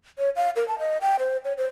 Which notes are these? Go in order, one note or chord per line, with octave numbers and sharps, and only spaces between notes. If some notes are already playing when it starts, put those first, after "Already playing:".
C#5
F5
A#4
A5
D#5
G5
C5
C#5
C5